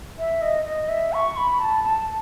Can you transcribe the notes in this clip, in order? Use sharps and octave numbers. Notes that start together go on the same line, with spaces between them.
E5
D#5
D#5
E5
C#6
B5
A5
A5